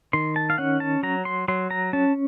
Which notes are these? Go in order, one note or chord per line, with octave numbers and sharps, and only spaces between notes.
D#3 C6
A5
F5
C#4 F#5
A5
F#3 A#5
C6
F#3 C6
A#5
C#4 A5